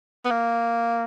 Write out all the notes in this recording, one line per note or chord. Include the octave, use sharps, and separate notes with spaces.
B3
A#3